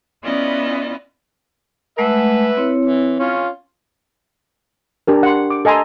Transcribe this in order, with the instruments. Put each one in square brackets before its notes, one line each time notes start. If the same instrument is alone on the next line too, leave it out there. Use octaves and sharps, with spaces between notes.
[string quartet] B3 C#4 E4 F4 D5 D#5
[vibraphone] G#3 A3 F#5 [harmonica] B4 E5
[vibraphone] C4 E4 C#5
[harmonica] E3
C#4 F4
[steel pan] D4 G4 A#4
F#5 C6
D6
A4 D#5 G#5 A#5 C6